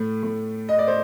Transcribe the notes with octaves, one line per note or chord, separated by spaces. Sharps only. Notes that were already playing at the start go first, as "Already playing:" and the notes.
Already playing: A2 A3
A2
D#5
D5
C5